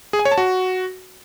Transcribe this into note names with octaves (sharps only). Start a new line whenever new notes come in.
G#4
G#5
C#5
A5
F#4